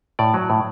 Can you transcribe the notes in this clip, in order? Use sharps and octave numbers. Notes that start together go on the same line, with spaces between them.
A2 D5
F#3
A2